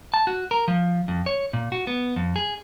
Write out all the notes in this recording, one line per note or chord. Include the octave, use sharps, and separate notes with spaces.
A5
F#4
A#4
F3
F2
C#5
A#2
F#4
B3
F2
G#4